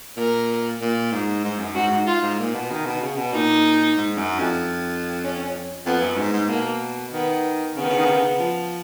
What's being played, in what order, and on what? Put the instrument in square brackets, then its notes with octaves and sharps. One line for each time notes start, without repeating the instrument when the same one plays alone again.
[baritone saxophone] A#2 [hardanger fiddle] A#4
[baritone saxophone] A#2
G#2
G#2
F#2
[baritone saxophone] G#2 [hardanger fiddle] F#4
[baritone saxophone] G#2
[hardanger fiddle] F4
[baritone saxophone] G#2
A#2
B2
D#3
B2
C#3
B2
[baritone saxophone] A#2 [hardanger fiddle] D#4
[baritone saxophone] G#2
F#2
F2
[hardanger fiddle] C#4
[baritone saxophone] F2 [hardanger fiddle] B3
[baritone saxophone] F#2
G#2
G#2
[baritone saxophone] B2 [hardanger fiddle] A#3
[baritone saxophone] D#3 [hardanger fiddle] B3
[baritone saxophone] C#3 [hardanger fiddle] B3
[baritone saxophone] D#3
C#3
D#3
C#3
D#3
C#3
F3